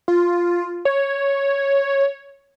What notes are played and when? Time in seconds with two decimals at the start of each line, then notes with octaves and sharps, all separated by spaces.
0.08 F4
0.85 C#5